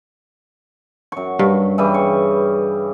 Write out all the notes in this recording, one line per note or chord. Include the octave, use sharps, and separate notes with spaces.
F#2 C#6
G2
C#3 E3 G3
C#6